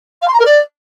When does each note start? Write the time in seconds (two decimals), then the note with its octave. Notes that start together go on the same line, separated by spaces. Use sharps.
0.22 F5
0.28 C6
0.33 A#5
0.39 A#4
0.45 D5